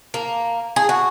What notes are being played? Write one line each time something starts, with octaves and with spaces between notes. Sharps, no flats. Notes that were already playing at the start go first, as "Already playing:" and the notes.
A#3
G#4
F#4